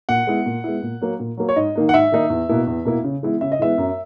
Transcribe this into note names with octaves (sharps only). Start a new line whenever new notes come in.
A#2 F#5
G#3 B3 E4
A#2
G#3 B3 E4
A#2
F#3 A#3
A#2
F#3 A#3
C#5
G#2 D#5
D#3 A#3 D#4
F#5
G#2 E5
D#3 A#3 D#4
E2
B2 A#3 E4
E2
B2 A#3 E4
C#3
E3 G#3 B3 E4
C#3 E5
D#5
E3 G#3 B3 E4 E5
F#2